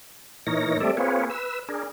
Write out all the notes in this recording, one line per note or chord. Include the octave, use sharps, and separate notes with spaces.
A#2 E3 D#4 A#4 C#5 A#6
G3 A3 C4 A4 D5 E5
A#3 C4 F4 G#4 B4 C#5
B4 E6
D4 G#4 A#4